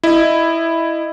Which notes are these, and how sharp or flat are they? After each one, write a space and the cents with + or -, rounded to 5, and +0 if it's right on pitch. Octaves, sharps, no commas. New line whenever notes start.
E4 +0 D#5 -20